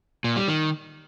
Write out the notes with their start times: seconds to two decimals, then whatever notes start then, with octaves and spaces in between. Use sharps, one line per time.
0.24 A#2
0.36 G3
0.48 D#3